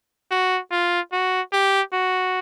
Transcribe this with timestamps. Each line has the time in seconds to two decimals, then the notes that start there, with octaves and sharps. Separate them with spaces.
0.31 F#4
0.72 F4
1.12 F#4
1.53 G4
1.93 F#4